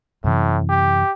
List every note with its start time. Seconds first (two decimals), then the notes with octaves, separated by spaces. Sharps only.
0.24 F#2 A2 C3 E3
0.69 G4